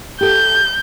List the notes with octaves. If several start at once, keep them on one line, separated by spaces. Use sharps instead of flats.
G4 A4 G6